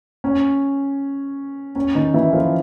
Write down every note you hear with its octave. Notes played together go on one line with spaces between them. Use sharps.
C#4
C#4
D#3 D#4
E3 E4
F3 F4